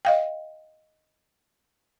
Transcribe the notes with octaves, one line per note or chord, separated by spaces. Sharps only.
D#5 F5 G5